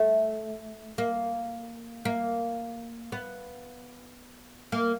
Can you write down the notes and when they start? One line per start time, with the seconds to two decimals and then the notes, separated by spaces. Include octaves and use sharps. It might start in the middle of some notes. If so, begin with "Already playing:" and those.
Already playing: A3
0.98 A#3
2.05 A#3
3.12 B3
4.72 A#3